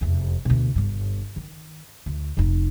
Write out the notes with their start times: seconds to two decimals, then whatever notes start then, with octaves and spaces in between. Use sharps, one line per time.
0.01 F1 E2
0.45 D2 B2
0.76 G1 G2
1.36 D#3
2.06 D2
2.37 F1 D#4